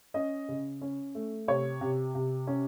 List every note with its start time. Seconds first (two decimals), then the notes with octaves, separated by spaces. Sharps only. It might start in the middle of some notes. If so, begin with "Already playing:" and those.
0.14 C#4 D#5
0.48 C#3
0.81 C#4
1.15 A3
1.48 C3 C#5
1.81 C3
2.15 C3
2.47 C#4